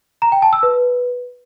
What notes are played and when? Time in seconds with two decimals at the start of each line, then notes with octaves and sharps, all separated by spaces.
0.22 A#5
0.32 G5
0.42 A5
0.53 E6
0.63 B4